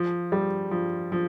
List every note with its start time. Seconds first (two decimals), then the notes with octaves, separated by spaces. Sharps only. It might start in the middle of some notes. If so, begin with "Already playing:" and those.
Already playing: F3
0.32 G3
0.71 F3
1.12 F3